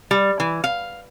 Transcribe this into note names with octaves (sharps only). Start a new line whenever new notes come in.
G3
E3
F5